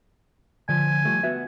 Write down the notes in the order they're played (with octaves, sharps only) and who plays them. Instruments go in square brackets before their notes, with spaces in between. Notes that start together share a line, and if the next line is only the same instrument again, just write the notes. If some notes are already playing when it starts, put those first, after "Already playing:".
[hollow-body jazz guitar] D3 F3 [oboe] G#5
[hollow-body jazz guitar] F3 G3 A3
B3 F#4 E5